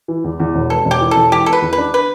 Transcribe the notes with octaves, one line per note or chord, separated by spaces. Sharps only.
E3
E2
E2
E1
B3 A4
E1
G4
E3
A4
E1
E3 G4
B3 A4
B4
E2
B4
D4
B4